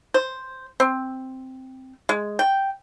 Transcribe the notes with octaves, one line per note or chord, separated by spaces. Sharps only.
C5
C4
G#3
G5